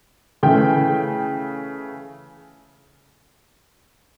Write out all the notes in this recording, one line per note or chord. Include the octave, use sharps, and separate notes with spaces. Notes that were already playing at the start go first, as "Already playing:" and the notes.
C#3 E3 A3 G5